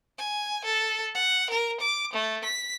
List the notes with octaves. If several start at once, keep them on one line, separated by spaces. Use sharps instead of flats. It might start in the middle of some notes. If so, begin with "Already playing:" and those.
G#5
A4
F#5
A#4
D6
A3
B6